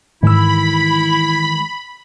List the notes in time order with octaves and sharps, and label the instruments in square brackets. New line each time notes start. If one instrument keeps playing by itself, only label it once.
[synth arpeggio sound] G#2 E6 [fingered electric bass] D#3 E3 G#3 [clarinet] E4 [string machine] B5